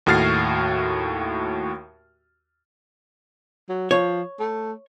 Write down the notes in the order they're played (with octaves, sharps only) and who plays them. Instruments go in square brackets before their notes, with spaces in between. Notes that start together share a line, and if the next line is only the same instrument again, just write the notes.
[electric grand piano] D#2 A2 F#4 F6 A6 C7
[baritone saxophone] F#3
[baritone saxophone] F3 [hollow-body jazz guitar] C#5
[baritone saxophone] A3